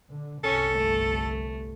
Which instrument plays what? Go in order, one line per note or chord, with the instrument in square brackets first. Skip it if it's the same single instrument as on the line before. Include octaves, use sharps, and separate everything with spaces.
[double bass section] D3
[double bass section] G1 C2 [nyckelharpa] C#4 [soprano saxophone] A4
[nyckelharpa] A3